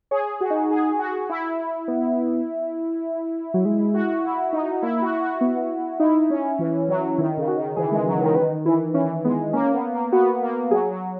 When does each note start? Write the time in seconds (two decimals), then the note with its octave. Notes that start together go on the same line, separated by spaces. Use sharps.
0.11 G#4 C#5
0.41 F#4
0.50 D#4
0.71 G#4
0.99 F#4
1.29 E4
1.88 B3
3.54 F#3
3.65 G#3
3.94 F#4
4.24 E4
4.53 D#4
4.82 A#3 E4
5.02 F#4
5.22 F#4
5.41 B3
6.00 D#4 E4
6.30 C#4
6.59 E3
6.89 F#3
7.18 D#3 E4
7.37 C#3
7.47 F#4
7.57 D#3
7.76 E3 G#4
7.92 G#3
8.06 F#3
8.21 D#3 A#4
8.35 D#3 B4
8.65 E3 E4
8.94 E3 C#4
9.24 G#3 B3
9.53 A#3 C#4
9.73 B3
9.93 A#3
10.12 B3 F#4
10.42 A#3
10.71 F#3 G#4
10.91 F#3